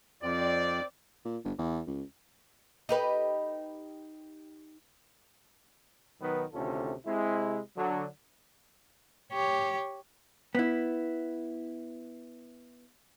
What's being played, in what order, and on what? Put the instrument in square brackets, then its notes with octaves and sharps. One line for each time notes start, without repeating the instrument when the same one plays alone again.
[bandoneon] F2 [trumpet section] C4 D5
[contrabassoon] A#2
G1
E2
C#2
[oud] D#4 G4 B4
[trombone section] B1 D#3 F#3 B3 B4
D2 C3 D#3 C#4 F4 A4
C3 G#3 E4
D3 F#3
[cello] G4 C#5
[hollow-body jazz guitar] B3 E4